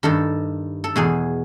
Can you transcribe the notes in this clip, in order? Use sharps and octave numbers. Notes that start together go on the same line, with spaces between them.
G2 D#3 A4
A4
E2 B2 G#4